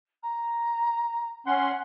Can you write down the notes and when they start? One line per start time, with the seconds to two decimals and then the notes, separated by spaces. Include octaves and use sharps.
0.22 A#5
1.47 C#4 F#5 C6